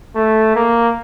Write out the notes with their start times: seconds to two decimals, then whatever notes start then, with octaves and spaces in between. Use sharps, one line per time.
0.15 A3
0.55 A#3